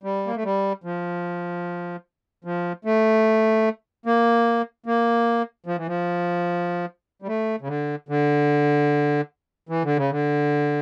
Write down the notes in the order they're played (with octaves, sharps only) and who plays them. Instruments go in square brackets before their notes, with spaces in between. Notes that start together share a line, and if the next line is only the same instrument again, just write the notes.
[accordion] G3
A#3
A3
G3
F3
F3
A3
A#3
A#3
F3
E3
F3
G3
A3
C#3
D3
D3
E3
D3
C#3
D3